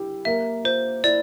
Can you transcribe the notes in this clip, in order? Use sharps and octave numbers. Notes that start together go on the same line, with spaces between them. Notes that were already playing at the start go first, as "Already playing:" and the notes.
Already playing: E4 G4
A#3 E5
F4 C5
E4 D5